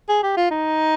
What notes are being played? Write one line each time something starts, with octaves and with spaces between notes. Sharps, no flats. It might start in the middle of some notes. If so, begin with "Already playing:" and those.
G#4
G4
F4
D#4